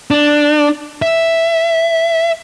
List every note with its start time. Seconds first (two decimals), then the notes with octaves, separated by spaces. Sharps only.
0.11 D4
1.02 E5